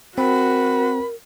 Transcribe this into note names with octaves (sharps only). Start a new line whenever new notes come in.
C4 F#4 A#4 B5